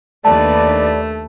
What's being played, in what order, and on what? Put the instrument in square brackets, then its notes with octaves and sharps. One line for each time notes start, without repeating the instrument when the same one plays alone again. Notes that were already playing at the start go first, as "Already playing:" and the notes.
[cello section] D#2 D4 B4 [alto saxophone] A3 [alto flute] D5 [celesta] A5